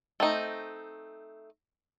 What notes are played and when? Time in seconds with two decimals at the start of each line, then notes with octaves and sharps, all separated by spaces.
0.20 A3 C4 D#4